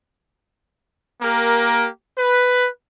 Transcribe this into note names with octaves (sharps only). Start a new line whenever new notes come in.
A#3 G4 A#4
B4